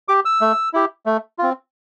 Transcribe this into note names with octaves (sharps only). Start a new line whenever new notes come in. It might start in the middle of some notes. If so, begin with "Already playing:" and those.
G4 D6
E6
A3
E4 G4
A3
C4 F4